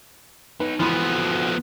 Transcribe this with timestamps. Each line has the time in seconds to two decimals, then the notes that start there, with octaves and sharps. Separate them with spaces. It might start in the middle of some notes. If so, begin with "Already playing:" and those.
0.60 B3 D#4 B4
0.80 E3 F3 B3 F#4 A4 B5 C6